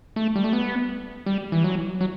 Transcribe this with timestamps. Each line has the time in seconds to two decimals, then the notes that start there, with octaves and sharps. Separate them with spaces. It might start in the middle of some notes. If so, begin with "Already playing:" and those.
0.16 A3
0.36 G3
0.44 A3
0.53 B3
1.26 G3
1.52 E3
1.64 F#3
2.01 F#3